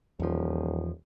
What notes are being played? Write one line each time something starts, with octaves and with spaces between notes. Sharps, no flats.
D#1 E2 F3